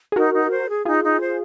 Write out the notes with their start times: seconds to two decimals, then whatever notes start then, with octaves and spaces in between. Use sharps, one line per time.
0.12 G#4
0.16 D#4 F#4 A#4
0.34 D#4
0.51 C5
0.69 G#4
0.85 D#4 F4 G#4
1.04 D#4
1.20 C5